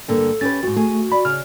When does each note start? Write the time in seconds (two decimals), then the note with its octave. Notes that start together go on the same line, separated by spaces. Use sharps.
0.08 G2 D3 A#3 A4
0.41 C#4 G4 B4 A6
0.63 F2 G#2 F#4
0.77 A3 G#4
1.12 D5 B5
1.25 C#3 F6